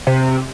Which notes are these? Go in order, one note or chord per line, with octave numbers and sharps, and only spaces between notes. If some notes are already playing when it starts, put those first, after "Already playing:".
C3